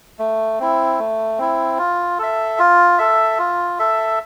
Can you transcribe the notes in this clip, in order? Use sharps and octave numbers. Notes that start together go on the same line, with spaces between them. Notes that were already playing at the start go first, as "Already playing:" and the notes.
A3
C4 E4
A3
C4 E4
F4
A4 E5
F4
A4 E5
F4
A4 E5